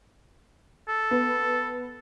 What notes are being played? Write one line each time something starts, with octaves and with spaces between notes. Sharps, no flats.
A4
B3